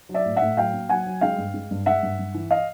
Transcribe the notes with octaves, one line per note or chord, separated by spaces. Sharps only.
F#3
D5 E5
A2
E5 F#5
A2
F#3 F5 G5
A#3
F#3 F#5 G#5
F#3
G#3 F5 G5
G2
G#3
G2
G#3 E5 F#5
G2
G2
E3
D#5 F5